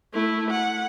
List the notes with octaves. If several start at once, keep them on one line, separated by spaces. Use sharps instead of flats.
A3 E4
F#5